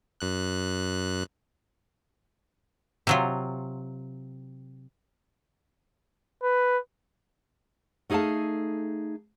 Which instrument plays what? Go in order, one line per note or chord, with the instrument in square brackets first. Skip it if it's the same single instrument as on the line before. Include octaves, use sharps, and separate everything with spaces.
[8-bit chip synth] F#2 F#6
[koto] C3 F#3 F4
[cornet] B4
[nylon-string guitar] A3 D#4 G#4 A4 F5 A5